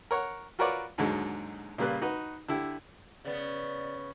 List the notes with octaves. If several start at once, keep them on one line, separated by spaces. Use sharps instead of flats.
A#4 C#5 F#5
F4 F#4 A#4 B4 C#5 D5
D#2 G#2 D3 F#3 G#3
A#2 C#3 G3 A#3 B4 F#6
D#4 F#4 B4
D3 E4 G4
C#3 B3 D5